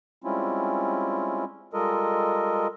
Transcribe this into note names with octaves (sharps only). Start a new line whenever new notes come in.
G3 G#3 C4 C#4 E4 F4
G3 G#3 F4 A4 A#4 D#5